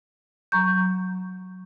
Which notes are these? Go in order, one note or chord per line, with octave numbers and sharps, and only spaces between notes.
F#3 A#5 C#6 G6